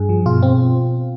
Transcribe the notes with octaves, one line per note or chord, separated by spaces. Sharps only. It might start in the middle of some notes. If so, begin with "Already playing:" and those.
Already playing: G2 G#4
F3
B2 F4
C4